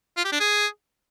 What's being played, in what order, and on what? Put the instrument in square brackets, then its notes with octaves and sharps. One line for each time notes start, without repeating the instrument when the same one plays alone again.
[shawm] F4
G4
D4
G#4